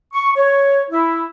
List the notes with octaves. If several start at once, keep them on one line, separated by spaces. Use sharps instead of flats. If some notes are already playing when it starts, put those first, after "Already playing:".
C#6
C#5
E4